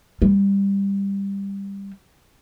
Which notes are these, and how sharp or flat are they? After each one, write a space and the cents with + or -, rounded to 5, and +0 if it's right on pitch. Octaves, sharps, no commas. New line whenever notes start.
G3 +15